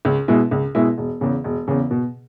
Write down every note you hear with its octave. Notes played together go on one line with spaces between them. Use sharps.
C#2
B2 G#3 E4
C#2
B2 G#3 E4
E1
E2 C#3
E1
E2 C#3
B2